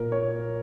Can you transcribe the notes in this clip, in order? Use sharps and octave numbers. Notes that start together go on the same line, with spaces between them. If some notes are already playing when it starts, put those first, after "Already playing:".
Already playing: A#2 A#4
A#3 C#5